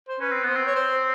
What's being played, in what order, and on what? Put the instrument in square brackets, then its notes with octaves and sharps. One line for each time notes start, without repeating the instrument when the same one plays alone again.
[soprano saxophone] C5
[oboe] C#4 [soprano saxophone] B4
[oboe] C4
[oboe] B3 [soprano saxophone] C5
[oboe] C4
[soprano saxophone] C#5
C5